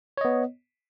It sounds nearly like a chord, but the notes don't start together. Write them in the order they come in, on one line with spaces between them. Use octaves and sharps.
C#5 D#5 B3